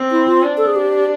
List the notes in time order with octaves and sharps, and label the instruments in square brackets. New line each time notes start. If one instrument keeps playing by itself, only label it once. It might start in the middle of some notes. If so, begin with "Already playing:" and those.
Already playing: [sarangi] C4
[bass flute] E4
F4
[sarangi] D4
[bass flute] A4
G#4
G4